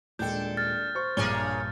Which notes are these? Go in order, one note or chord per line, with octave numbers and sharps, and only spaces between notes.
D#1 G#3 D4 A4 G5 G6
F6 A6
C5 C#6
A#1 G2 A#3 G#4 C#5 G7